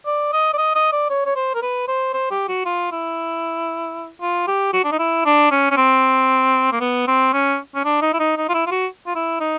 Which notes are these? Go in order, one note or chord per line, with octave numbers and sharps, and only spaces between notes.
D5
D#5
D5
D#5
D#5
D5
C#5
C#5
C5
A#4
B4
C5
C5
G4
F#4
F4
E4
F4
G4
F#4
D4
D#4
E4
D4
C#4
C#4
C4
A#3
B3
C4
C#4
C#4
D4
D#4
E4
D#4
D#4
F4
E4
F4
F#4
F4
E4
D#4